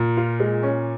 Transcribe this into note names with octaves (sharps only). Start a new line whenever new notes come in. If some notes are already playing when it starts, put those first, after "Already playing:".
Already playing: A#2
F4
G#3
C#4